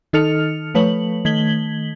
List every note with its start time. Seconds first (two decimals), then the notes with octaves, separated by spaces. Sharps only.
0.13 D#3 D#4 A4 F6 C#7 F7
0.75 F3 A3 B4 C#5 F#7
1.25 D#3 A3 G#6 B6 F#7 G7